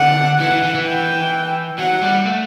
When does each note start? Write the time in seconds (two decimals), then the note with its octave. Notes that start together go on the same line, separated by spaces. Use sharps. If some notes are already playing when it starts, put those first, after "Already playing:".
Already playing: D3 F#5
0.40 E3 F#5
0.51 E3
0.63 E3
0.75 E3
0.86 G5
1.79 F#3 F#5
2.02 G3
2.26 A3